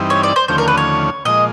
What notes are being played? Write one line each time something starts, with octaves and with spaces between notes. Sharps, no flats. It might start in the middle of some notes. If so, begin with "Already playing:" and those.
Already playing: G2 E3 G3 C4 D#4
C#5
D5
C5
D#2 D3 F3 A3 C#4 C5
A#4
B4
C#5
A#2 F3 G#3 D#5